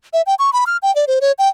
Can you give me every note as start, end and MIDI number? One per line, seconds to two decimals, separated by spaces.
0.13 0.22 76
0.26 0.35 79
0.39 0.50 85
0.53 0.64 83
0.67 0.77 89
0.83 0.94 79
0.95 1.05 74
1.08 1.19 72
1.21 1.32 73
1.39 1.49 79